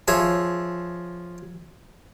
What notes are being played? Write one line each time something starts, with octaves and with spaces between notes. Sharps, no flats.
F3 G#4 C#5 E5